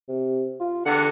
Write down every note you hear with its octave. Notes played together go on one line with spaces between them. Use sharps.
C3
F4
E2 G2 D3 F#5